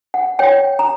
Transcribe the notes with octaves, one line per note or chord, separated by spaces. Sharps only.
F#5
C#5 G5
A#5